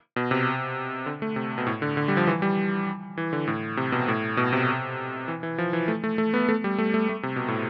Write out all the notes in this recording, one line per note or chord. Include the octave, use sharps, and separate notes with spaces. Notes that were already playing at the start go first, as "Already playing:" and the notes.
B2
C3
D3
A3
C3
B2
A2
D3
D3
G3
F3
E3
G3
E3
D3
A2
C3
B2
A2
B2
C3
E3
E3
F3
E3
A3
A3
A3
B3
A3
G3
A3
A3
A3
C3
B2
A2